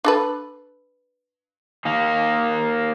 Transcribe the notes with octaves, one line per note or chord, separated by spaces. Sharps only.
D4 A4 B4
D#3 A#3